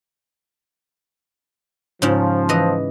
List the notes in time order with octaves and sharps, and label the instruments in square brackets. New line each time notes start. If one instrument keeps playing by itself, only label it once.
[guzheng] G#2 C#3 [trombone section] F3
[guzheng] E3 D#5